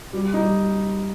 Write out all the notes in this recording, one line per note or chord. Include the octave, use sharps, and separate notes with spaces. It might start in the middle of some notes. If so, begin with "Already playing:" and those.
G3
D#4
G3